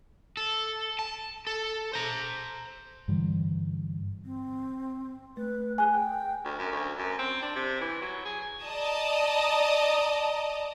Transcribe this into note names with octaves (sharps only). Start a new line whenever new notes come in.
A4
A5
A4
C5 A#5
G2 D3 E3 G3
C4
A3 B4
G#4 G#5 F#6
G5
D2
F#2
D2
F#2
C4
D4
C3
E3
F#3
G#4
D5 D#5 A5 A#5 D#6